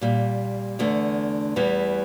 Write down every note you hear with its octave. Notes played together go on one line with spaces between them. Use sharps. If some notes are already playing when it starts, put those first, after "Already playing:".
A#2 G3
E2 D3 A3
E2 E3 G3